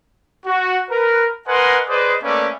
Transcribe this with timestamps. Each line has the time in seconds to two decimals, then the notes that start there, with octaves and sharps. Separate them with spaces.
0.46 F#4
0.90 A#4 B4
1.48 A#4 B4 D#5 F#5 G#5 C6
1.88 G#4 B4 C5 D5 D#5
2.22 A3 A#3 C#4 B4 D5 E5